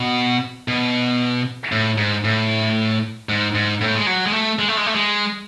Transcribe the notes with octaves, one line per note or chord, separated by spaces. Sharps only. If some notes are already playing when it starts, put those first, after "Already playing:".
Already playing: B2
B2
A2
G#2
A2
G#2
G#2
A2
G#3
F#3
G#3
A3
G#3
A3
G#3
A3
G#3